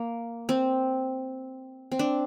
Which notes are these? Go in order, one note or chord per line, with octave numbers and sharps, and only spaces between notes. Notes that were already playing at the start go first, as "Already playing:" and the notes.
Already playing: A#3
C4
C4
D4